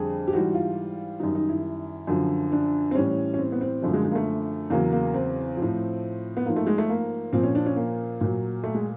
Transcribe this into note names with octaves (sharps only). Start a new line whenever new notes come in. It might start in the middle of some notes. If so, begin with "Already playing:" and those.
Already playing: F2 D3 G3 G#4
G4
G#2 E3 G3 F#4
F4
F#2 D#3 G3 D#4
D#4
E4
F#2 D3 F3
D4
C4
A2 E3 G3 C#4
C#4
C4
B3
C4
F#2 D3 F3 A3
G#3
G#3
A#3
A3
E2 C#3 F#3 A#3
A#3
C4
A2 F3
B3
G#2 F3 A#3
A3
G#3
A3
A#3
A#2 F3 C4
C#4
D4
C#4
A#3
A#2 F#3
A3
G#3